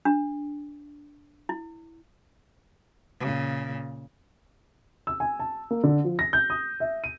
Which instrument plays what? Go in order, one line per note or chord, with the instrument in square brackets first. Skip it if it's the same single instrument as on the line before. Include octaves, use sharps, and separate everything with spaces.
[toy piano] D4
E4
[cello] A#2 C#3
[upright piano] E6
G#5
A5
A#3
D3
F3
A#6
G6
D#6
E5
D#7